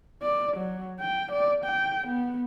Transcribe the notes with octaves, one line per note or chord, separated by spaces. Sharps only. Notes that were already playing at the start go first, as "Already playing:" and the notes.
D5
F#3
G5
D5
G5
B3